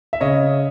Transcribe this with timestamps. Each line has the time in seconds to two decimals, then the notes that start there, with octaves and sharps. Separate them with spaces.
0.13 E5
0.20 C#3 C#5 D#5